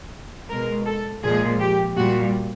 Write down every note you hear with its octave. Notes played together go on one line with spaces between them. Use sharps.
B2 G#3 A#4
A4
A#2 F3 G#3 G#4
G4
A#2 G3 F#4